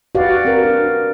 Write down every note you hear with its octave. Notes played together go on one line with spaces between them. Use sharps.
F#4 G4 B4 D5 F5
C4 A#4
D4